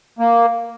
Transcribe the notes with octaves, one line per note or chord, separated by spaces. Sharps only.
A#3